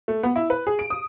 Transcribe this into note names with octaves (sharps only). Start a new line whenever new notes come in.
A3
B3
E4
B4
G#4
D7
D#6